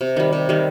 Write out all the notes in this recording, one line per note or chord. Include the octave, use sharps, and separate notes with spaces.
C3
D#3 G3
C3
D#3 G3